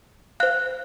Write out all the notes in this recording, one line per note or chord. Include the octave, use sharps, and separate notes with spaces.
C5 F5 F#6